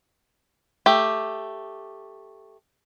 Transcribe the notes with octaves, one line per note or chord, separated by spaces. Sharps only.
A3 G4